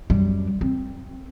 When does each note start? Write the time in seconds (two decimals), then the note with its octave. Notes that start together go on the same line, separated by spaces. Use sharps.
0.10 F#2 G3
0.61 C4